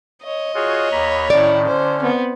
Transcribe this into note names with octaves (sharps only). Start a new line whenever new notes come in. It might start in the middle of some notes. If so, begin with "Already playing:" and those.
C#5 D#5
F4 F#4 G#4 C#5
D#2 A#5 B5
A2 D#3 C#4 E4 D5
D3 C#4 C5
B3 C4